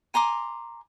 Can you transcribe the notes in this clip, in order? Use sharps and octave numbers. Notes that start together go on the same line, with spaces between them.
G#5 A#5 C6 D6